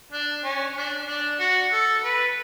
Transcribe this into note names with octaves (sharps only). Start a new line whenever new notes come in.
D4
C#4
D4
D4
F#4
A4
B4